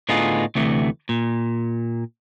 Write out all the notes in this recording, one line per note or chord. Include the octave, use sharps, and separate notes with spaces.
A2 D3 B3 D#4 F4 G#4
D2 C3 E3 A3
A#2